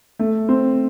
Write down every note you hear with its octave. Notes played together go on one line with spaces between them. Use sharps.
A3
C4